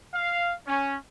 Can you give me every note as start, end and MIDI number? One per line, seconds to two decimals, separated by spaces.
0.14 0.54 77
0.67 0.96 61